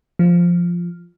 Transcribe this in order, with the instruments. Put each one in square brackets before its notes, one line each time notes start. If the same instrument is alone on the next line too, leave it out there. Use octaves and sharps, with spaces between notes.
[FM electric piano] F3